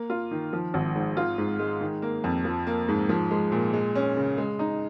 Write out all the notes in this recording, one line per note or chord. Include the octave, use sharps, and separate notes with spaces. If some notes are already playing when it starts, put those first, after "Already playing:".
Already playing: A#3
F4
D#3
F3
G#1
G#2
F4
G#2
G#3
D#3
A#3
F2
F3
A#3
G#2
F3
G#3
A#2
G#3
C#4
C#3
G#3
D#4